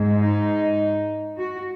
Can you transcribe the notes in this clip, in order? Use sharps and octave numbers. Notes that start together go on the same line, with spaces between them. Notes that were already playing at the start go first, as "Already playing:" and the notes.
Already playing: G#2 G#3
D#4
F#4